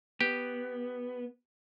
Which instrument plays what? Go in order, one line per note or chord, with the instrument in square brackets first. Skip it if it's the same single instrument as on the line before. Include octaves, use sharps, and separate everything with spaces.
[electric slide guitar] B3 [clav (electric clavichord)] G4